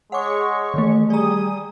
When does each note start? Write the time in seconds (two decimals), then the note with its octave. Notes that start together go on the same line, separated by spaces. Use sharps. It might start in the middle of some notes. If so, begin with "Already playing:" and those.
0.12 G#3 G#4 C#5 F#5 C#6 D6
0.74 D#3 E3 A3
1.10 G3 G#4 D5 A#5 D#6